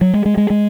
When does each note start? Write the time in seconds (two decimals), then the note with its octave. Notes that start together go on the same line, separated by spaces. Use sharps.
0.01 F#3
0.14 G#3
0.25 G#3
0.37 G#3
0.50 G#3